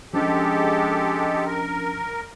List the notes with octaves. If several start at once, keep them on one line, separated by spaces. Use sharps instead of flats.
F3 G#3 C#4 D4 G4 A4
A#4